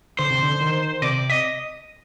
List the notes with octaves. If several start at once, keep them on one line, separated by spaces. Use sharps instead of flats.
D3 C5
C3
D3
D#3
C3 D5
D#5